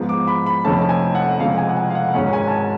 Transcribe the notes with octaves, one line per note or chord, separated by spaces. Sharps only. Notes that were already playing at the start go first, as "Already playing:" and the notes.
Already playing: G#2 F3 B3
D6
B5
B5
F1 F2 F3 A3 C#4 A5
A5
G#5
F#5
F1 F2 C#3 F3 G#3 F5
G#5
F#5
G#5
F5
F#5
G#1 G#2 G#3 C#4 F#5
G#5
A5
G#5